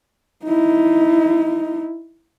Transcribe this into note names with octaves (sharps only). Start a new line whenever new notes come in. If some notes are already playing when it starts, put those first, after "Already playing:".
D#4 E4